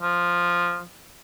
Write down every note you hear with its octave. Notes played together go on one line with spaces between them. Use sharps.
F3